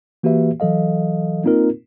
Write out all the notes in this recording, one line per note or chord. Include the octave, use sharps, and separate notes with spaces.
E3 A#3 F#4 G4 B4 E5
E3 F#3 A4 D#5 F5
A#3 C4 D#4 F4 A#4